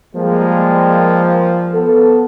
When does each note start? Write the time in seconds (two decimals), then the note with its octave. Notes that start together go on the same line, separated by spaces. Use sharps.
0.16 F3 G3 G#3 A#3
1.74 B3 A4